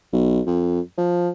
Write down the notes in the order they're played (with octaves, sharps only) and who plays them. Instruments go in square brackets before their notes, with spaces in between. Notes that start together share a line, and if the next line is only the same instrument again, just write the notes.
[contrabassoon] B1
F2
F3